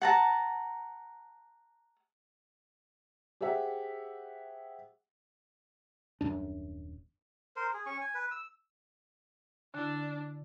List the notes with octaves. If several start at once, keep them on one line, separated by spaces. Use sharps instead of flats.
F#5 A5 A#5
G4 G#4 C5 E5 F#5
D#1 F#2 D4
A#4 C5
G#4
C#4 C#6
G#5
B4
E6
D3 D4 E4